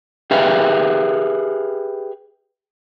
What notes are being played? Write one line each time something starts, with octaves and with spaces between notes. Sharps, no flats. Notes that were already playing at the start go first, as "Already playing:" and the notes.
G4 G#4 B4 E5 F5